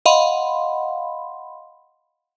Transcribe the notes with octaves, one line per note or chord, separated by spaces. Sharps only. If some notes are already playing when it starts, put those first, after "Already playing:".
D#5 F5 F#5 B5 C6